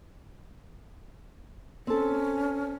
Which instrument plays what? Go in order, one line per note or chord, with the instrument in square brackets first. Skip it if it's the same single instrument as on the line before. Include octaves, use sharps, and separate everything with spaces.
[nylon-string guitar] C4 A4 [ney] C#4